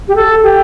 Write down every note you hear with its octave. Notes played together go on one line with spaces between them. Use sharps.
G4
A4
G4